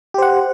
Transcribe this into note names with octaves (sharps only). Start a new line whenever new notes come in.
G4 C5 F#5